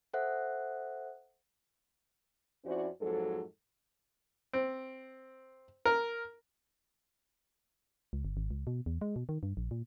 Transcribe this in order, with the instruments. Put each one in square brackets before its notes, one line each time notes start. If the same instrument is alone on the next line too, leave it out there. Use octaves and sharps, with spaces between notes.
[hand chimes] A4 C5 E5 F#5 F#6
[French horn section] F2 C#4 E4 F#4 C5 D5
F2 G#2 F#3 A4
[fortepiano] C4
A#4
[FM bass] C#2
G1
G#1
C#2
B2
E2
G#3
B2
D#3
G2
A#1
A#2